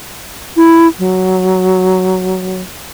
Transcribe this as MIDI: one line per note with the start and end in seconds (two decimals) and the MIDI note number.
0.57 0.87 64
0.99 2.62 54